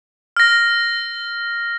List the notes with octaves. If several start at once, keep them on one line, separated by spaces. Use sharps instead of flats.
F6 A#6